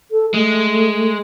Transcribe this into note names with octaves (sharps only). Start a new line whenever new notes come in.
A4
G#3 A3